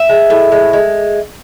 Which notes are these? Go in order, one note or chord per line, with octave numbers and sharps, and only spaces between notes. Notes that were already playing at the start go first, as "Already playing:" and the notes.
Already playing: E5
G#3
A2
G#3
G#3